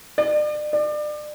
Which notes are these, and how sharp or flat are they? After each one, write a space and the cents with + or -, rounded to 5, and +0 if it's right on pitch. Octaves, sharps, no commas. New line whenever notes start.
D5 +40
D5 +30